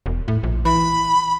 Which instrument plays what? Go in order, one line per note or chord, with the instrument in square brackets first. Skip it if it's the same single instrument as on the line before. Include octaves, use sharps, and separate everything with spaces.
[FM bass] E1
A2
A#1
[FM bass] E3 [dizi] B5